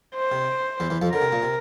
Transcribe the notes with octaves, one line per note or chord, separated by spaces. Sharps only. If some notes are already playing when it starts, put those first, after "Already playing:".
C5
C3
E2 E3
E2 E3
F2 F3
D3 A#4
C3
A#2
C3